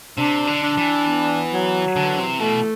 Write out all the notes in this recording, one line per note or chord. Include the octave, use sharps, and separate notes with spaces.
C3 D4
D3
D4
E3
B3
F#3
D3 E3
C3
B2 A3